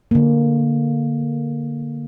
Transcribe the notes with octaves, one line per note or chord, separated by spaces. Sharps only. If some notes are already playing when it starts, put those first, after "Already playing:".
D3 A#3